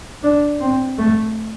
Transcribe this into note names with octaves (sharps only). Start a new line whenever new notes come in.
D4
C4
A3